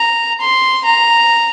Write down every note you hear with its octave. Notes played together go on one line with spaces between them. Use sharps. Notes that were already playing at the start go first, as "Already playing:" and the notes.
Already playing: A#5
C6
A#5